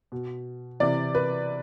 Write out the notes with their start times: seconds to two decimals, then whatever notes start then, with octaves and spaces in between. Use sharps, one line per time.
0.12 B2
0.80 C3 E3 D5
1.15 B4